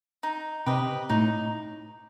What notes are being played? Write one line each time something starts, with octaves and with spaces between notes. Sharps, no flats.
D#4
C3 G4 B4 D#5
A2 D#4